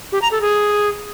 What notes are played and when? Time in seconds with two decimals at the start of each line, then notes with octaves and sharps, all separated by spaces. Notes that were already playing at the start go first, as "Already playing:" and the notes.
0.12 G4
0.22 A#5
0.31 A4
0.41 G#4